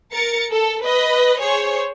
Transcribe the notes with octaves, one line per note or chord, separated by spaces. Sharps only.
A#4 A6 C#7
A4
B4 D#5
G#4 C5 C#5